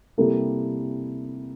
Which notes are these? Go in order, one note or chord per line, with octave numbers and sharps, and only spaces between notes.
C3 G3 A#3 E4 A4